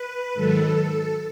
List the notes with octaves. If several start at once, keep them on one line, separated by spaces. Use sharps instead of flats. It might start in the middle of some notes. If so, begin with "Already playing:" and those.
Already playing: B4
G#2 D#3 F#3 A4